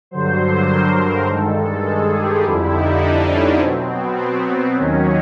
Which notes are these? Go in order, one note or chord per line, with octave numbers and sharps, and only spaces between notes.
G2 D3 F#3 C5
A#4
G2 D#3 G#3 A4
G#4
G4
F2 D3 G3 E4
D#4
D4
C#4
B2 F#3 C4
B3
C4
D#2 D#3 F#3 C#4